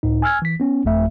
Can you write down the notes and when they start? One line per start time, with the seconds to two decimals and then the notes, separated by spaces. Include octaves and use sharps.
0.03 C#2 A2 D#4
0.22 G#5 E6 F6 G#6
0.42 E3 B6
0.60 B3 C#4
0.85 G1 F2 A3 E5